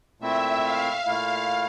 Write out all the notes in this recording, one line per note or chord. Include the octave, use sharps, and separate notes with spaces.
A#2 A3 C4 E4 E5
F5
A#2 A3 E4